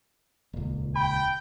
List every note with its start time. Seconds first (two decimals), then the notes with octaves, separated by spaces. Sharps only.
0.53 D#1 C#2
0.96 G5 B5